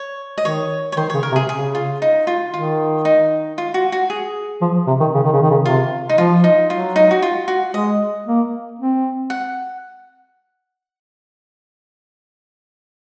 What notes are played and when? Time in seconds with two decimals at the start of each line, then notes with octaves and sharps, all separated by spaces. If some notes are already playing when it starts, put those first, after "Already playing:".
Already playing: C#5
0.38 D#5
0.45 D#3 C#5
0.92 C#5
0.97 D#3 C5
1.10 C#3 C#5
1.23 A#4
1.32 C3
1.36 G#4
1.49 C#3 G#4
1.75 F4
2.02 D#4
2.27 F4
2.53 D#3 F4
3.05 D#4
3.58 F4
3.74 F#4
3.92 F#4
4.10 G#4
4.61 F3
4.87 C3
5.00 D#3
5.14 C#3
5.23 D#3
5.32 C#3
5.42 D#3
5.51 C#3
5.65 C3 F4
6.09 D#4
6.18 F3 F4
6.44 D#4
6.69 F#3 F4
6.96 D#4
7.11 F#4
7.22 F4
7.48 F#4
7.74 G#3 D#5
8.26 A#3
8.79 C4
9.30 F#5